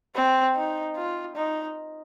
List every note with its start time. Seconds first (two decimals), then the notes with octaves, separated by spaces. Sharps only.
0.15 C4
0.55 D#4
0.97 F4
1.36 D#4